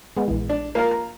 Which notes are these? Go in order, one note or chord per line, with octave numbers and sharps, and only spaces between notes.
G#3 B3
A#1 E3
D4
A#3 F4 A#4
A#5